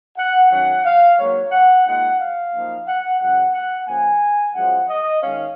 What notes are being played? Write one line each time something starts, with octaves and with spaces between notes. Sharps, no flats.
F#5
D#3 F#3 C#4 F#5
F5
G#2 F#3 A#3 C#5
F#5
A#2 G#3 D#4 F#5
F5
F#2 F3 A#3 D#4
F#5
F#2 C#3 G#3 F#5
F#5
C#3 F3 A#3 G#5
F#2 F3 G#3 C#4 F#5
D#5
D#3 G#3 C#4 F5